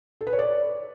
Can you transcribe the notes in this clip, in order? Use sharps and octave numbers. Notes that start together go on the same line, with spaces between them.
A4
B4
C#5
D5